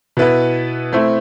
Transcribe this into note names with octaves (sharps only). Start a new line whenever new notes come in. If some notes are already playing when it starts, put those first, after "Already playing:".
B2 B3 E4 B4
A3 C4 E4